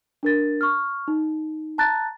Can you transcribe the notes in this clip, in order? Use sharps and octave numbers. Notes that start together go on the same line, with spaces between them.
D4 A#4 A6
C#6 F6
D#4
A5 A#5 F#6 A6